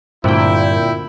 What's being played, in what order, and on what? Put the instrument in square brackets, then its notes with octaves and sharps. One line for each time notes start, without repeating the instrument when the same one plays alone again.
[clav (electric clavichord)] D2 C4 [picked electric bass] G2 [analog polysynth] A#2 G5 [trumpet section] E4